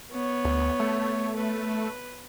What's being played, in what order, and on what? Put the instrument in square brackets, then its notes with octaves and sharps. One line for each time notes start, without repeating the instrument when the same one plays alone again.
[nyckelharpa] B3 C#5
[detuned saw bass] D2
A3
[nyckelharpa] B4